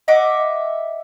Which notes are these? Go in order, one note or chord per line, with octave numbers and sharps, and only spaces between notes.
D#5 E5 F#5 D6